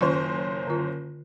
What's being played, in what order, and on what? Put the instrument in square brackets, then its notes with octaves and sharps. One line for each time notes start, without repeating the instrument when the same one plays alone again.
[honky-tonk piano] F#1 C#4 C5 [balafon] D#3 F4
[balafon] D3 F4